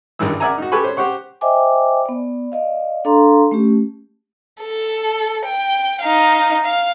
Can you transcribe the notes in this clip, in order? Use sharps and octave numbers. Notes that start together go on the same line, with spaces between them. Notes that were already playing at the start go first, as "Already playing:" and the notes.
G#1 G2 D#3 E3 G3 E6
A#4 D5 E5 F#5 G#5 A#5
D#4 F#4
G4 A4 B4 G#5 B5 C#6
C5 C#5
G4 C5 F#5 C#6
C5 D#5 E5 G5 G#5 D6
B3 D5
D5 D#5 F5
D4 A4 F5 A#5 C6
A3 C#4 G4
A4
G5
D#4 F5
F5